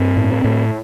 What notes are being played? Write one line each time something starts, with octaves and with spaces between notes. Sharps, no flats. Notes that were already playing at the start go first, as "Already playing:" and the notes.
Already playing: G2 C4
A2
A2